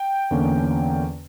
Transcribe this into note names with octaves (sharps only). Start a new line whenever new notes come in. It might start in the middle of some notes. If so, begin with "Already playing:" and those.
Already playing: G5
E2 D3 A#3 C#4